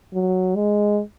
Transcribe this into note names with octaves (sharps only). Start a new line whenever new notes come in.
F#3
G#3